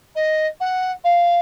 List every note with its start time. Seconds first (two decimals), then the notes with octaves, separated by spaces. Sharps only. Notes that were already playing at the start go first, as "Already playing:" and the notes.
0.15 D#5
0.60 F#5
1.04 F5